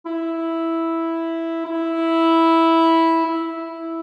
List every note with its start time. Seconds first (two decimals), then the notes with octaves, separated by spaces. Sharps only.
0.06 E4
1.66 E4
3.25 E4